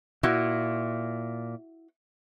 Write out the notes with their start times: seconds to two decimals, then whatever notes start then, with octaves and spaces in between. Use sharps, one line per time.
0.23 A#2 E4 F#4